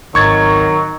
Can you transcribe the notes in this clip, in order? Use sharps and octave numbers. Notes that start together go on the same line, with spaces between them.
G#1 C#2 D#3 F#3 C#6 G#6 A6